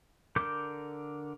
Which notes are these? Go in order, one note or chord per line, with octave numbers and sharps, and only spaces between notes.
D3 A4 A#4 D6 G6